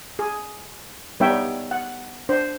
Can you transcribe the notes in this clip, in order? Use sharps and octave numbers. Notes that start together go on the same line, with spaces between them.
G#4
G3 B3 D#4 C#5 E5 G5
F#5
D4 C5